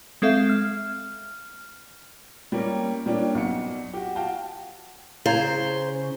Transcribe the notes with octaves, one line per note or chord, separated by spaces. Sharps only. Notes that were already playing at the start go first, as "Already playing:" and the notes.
G#3 C4 A4 E5 F5
F6
G3 A#3 C#4 A#4
G3 A#3 C#4 D4
B1 F#5 C#7
F#4 G4
F#4 F5 G5 A5
C#3 E4 C5 F5 A#5 G#6